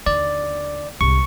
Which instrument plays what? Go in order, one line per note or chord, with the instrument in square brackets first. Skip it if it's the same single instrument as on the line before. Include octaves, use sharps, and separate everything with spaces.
[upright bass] D#2 D3 [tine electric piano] D5
[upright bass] C2 G#2 [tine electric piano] C#6